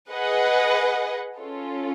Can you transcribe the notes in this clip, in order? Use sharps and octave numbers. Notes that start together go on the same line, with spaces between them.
G#4 B4 D#5 F#5
C#4 F4 A4